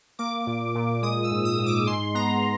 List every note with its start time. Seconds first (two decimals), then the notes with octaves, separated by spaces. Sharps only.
0.19 A#3 D6
0.47 A#2
0.75 A#2
1.02 G#3 D#6
1.24 E6
1.31 G#2
1.45 D#6
1.59 G#2
1.66 D6
1.87 G#3 C6
2.15 B3 A#5